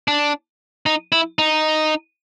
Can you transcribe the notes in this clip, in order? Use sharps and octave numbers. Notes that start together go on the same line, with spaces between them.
D4
D#4
E4
D#4